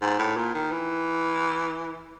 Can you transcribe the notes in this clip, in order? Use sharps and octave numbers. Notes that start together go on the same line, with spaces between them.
G#2
A2
A#2
D#3
E3